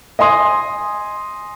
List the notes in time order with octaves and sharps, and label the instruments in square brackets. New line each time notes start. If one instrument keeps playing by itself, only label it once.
[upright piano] D#5 G#5 C6 D#6